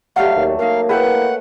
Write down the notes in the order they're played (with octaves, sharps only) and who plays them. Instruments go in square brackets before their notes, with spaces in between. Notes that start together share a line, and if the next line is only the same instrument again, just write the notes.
[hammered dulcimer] F#3 A3 [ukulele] G4 D5 F#5 [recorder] F5
[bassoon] D#2
[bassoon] A#3 [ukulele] D4 D#4 [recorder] F5
[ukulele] E4 G#4 [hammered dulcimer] B4 G5 A5 [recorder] F#5